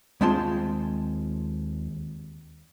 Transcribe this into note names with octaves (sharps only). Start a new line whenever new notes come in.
D#2 G#3 C4 F4 A5 C6